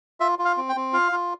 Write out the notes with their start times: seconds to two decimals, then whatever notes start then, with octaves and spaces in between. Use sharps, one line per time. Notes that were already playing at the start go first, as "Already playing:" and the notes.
0.20 F4 E5
0.39 F4
0.45 F5
0.57 C4
0.69 G5
0.76 C4
0.93 F4 F5
1.12 F4